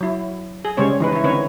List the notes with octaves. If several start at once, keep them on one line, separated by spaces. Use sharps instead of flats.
F#3 E4
G#4
C#3 G3 G#3 C#4 C5 C#5
E3 D#4 B4
E4 C#5
D3 C4 C#4 D#4 B4 C#5